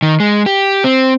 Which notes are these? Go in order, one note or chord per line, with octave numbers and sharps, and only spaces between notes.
D#3
G#3
G4
C4